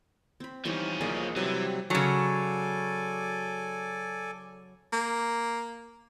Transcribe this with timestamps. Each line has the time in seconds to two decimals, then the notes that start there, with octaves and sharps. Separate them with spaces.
0.40 C4 B5
0.65 E3 F3 G3 C#4 D#4
1.01 B1 A#3 G#4 D5 D#5 B5
1.36 C3 E3 F#3 G3 C4
1.90 C#3 F#3 A4 D5 G#5
4.93 A#3